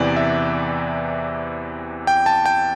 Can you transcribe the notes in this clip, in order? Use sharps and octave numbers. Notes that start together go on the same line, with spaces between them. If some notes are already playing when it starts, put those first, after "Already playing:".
Already playing: E2 C3 E3 D5
E5
G5
A5
G5